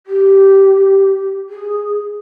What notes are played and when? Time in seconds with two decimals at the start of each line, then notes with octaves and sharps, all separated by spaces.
0.07 G4
1.49 G#4